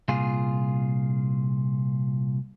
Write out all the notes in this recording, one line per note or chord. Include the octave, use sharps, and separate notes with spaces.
C2 A#2 F4 G#4